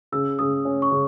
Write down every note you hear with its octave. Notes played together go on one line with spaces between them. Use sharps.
C#3 E6
C#3 D#6
C#4
C#6
C#3